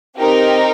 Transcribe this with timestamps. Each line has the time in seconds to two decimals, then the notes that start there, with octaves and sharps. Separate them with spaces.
0.18 C4 D#4 G4 A#4